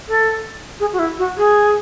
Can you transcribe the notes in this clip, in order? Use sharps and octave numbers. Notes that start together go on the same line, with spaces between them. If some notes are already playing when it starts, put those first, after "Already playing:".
A4
G#4
F#4
E4
F#4
G#4